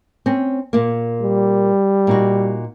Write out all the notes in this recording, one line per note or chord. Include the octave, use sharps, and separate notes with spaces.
C4 C#4
A#2 A#3
G3
A#2 D#4 F#4